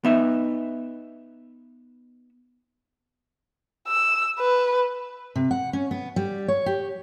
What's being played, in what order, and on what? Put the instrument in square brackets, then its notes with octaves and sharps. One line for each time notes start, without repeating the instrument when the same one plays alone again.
[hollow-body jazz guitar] B3 D#4 E5
[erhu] E6
B4
[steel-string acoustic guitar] C3
F#5
C#4
B3
G3
C#5
G4